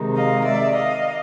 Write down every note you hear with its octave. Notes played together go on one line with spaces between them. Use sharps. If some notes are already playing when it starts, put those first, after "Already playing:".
Already playing: C3 D#3 G#3
D#5 F5
D5 E5
D#5 F5